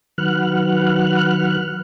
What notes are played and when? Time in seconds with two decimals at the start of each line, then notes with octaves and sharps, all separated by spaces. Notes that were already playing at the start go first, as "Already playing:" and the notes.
0.18 D#3 F#3 B4 F#5 F6 F#6